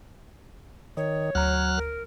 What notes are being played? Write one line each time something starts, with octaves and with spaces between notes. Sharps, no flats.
D#3 C#5
D2 F#3 A#5 F6 F#6
A#4